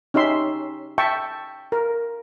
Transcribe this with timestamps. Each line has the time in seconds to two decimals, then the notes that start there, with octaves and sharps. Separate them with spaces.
0.14 C#4 D#4 G4 E5 C6
0.98 E5 G5 A5 C#6
1.72 A#4